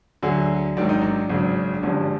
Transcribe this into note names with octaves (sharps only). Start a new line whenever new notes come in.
D2 D3 F#3 G#4
A1 G#2 D#3 F#3 D4
D#4
D4
G#1 F#2 C#3
D4
G#1 G2 D3 F3 G#3 C#4